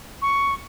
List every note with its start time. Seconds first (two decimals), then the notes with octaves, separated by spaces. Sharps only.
0.22 C#6